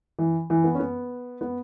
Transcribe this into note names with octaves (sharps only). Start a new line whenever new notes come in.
E3
E3
B3
C#4
B3
B3